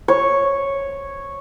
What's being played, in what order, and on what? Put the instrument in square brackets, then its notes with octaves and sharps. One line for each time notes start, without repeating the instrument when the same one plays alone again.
[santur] C#5